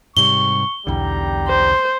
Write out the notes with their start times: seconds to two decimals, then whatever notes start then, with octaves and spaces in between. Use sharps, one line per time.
0.17 G#2 C3 G3 C#6 G7
0.87 B1 E2 D3 G3 G5 A#5
1.48 C5